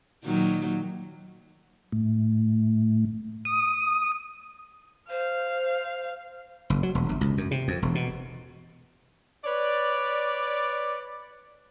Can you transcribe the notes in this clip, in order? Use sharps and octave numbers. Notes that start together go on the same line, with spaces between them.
A#2 D#3 F#3
A2
D#6
C5 F5
F#1
F#3
E1
G1
C#2
F#2
C3
F2
E1
B2
B4 C#5 D5